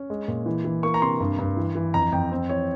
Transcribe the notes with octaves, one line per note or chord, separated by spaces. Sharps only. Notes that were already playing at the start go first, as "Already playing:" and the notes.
Already playing: C#4
G#3
A#2
E3
E3
A#3 C#6
A#5
C3 C6
G2
G2
E3
E3
F2 A#5
F2 G5
C4
E3 C#5